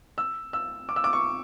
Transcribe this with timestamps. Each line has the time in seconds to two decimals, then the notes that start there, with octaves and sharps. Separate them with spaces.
0.18 E6
0.53 E6
0.89 D6
0.96 E6
1.04 D6
1.13 C#6